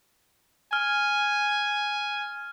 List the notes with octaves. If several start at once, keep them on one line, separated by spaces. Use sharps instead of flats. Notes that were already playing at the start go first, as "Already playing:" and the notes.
G#5 F6